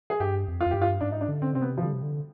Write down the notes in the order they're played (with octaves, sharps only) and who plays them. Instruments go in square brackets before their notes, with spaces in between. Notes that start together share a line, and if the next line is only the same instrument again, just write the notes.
[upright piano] G#4
[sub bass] G2 [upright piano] G4
[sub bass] F2
[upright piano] F4
[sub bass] F2
[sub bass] G2 [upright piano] G4
[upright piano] F4
[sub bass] G#2 [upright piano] D4
[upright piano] D#4
D4
[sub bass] D3
[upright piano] C4
[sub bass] C3 [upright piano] C4
[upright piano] B3
F3
[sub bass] D3 [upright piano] G3
[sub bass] C3
D3